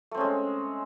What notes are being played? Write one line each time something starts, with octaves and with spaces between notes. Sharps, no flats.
G#3 A3 C4 C#4